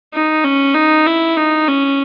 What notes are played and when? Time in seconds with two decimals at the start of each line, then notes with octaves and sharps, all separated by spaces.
0.13 D#4
0.44 C#4
0.74 D#4
1.06 E4
1.36 D#4
1.68 C#4